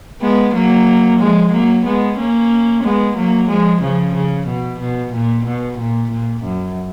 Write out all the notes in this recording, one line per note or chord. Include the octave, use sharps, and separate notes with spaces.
G#3 B3
F#3 A#3
F3 G#3
F#3 A#3
G#3 B3
A#3 C#4
G#3 B3
F#3 A#3
F3 G#3
C#3 F3
C#3
B2
B2
A#2
B2
A#2
A#2
F#2